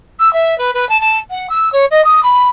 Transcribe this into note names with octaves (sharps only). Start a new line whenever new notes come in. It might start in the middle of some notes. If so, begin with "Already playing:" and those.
E6
E5
B4
B4
A5
A5
F#5
E6
C#5
D#5
D#6
B5